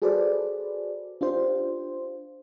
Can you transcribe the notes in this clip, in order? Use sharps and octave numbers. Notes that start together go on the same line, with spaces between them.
F#4 G#4 A4 B4 C5 D5
D4 F4 G4 C5